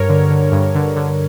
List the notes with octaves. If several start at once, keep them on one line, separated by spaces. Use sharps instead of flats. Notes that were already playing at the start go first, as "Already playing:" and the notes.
Already playing: G2 A#4 C#5
D3
D3
G2
D3
D3